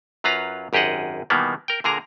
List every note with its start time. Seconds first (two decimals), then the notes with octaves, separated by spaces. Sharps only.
0.24 F#2 F#3 F4 B4 F5 A#5
0.73 G#1 F#2 G4 G#4 D#5 F#5
1.30 B2 D#3 E3 G3 A#3 B3
1.68 A#4 G5
1.84 A#2 D3 G#4 A#4 A#5